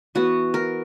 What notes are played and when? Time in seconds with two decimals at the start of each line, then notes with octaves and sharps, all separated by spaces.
0.15 E3 B3 F#4
0.54 A#4